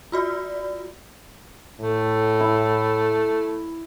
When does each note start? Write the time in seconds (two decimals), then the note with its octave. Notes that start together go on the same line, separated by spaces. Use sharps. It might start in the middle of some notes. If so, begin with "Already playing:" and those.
0.12 F4 F#4 D5
1.80 A2 A3
2.40 E4